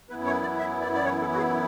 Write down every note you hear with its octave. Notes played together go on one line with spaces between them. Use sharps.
F#2 E3 B3 E4 B4
C#5
D5
E5
D5
D5
C#5
A4
F#4
G#4